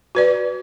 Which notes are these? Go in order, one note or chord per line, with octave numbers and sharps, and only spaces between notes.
F#4 B4 D5